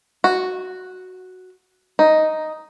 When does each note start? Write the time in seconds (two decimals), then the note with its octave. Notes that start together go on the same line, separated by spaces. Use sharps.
0.24 F#4
1.99 D#4